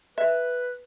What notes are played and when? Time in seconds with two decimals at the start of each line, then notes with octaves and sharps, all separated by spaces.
0.18 B4 E5